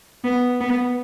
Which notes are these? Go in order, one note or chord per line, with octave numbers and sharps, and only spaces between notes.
B3
B3